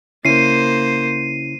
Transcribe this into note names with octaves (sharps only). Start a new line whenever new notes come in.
C#3 A#3 C#4 E4 C5 C7 D#7